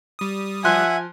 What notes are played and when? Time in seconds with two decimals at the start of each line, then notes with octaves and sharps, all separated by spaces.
0.19 G3 D#6
0.64 F3 E5 F#5 G#5 C6 F#6